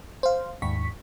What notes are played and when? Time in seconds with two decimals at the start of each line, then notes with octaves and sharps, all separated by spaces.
0.23 C5 F5
0.62 D#2 G#2 C#6 B6